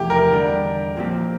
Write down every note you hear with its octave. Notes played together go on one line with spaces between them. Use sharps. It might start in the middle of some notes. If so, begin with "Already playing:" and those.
Already playing: E2 C3 F3 A3 E4 G4
A#4
E2 D3 G3 D4
A#2 F3 C4 G4